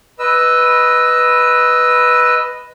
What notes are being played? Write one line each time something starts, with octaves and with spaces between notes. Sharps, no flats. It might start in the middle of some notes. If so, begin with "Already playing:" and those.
B4 D#5 E6